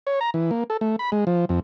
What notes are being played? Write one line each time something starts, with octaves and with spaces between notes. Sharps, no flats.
C#5
A#5
E3
A#3
A4
A3
B5
G#3
F3
F2